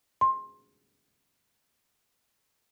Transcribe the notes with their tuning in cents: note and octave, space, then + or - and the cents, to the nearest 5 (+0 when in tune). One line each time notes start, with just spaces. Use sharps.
C6 +20